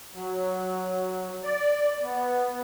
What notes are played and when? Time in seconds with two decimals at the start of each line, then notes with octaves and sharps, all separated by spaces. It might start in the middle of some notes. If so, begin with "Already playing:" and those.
0.14 F#3
1.44 D5
2.02 B3